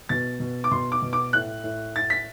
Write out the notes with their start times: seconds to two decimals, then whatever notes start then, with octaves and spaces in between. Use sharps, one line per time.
0.09 B2 A6
0.40 B2
0.64 D6
0.71 B2 C6
0.92 D6
1.02 B2
1.13 D6
1.33 A2 F#6
1.64 A2
1.95 A2 A6
2.10 B6